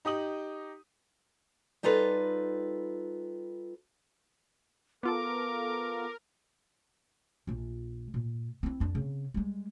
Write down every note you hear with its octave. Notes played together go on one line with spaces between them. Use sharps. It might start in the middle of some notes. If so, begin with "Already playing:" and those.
D#4 G4 D#6 F#7
G3 D#4 F4 A4 B4
B3 F4 A4 A#4 D6
A#1 F4
A#2
C4 E4
F2 D4
C#3 C4
G3 G#3